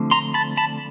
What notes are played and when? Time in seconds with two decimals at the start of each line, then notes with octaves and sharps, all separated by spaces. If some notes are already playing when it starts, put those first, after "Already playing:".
Already playing: D3 F3 A3 C4
0.11 A#5 C6
0.34 A5 B5
0.57 A5 B5